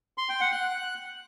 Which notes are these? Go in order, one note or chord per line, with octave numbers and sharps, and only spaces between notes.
C6
G5
F#5
F#6